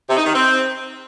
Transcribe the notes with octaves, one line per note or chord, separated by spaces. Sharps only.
C3
D#4
D#3
C4